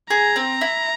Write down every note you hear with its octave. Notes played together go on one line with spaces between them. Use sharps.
G#4 A#5
C4
E4